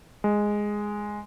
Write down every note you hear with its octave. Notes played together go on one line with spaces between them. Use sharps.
G#3